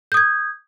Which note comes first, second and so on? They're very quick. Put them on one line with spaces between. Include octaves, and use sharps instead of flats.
G6 D#6 G#6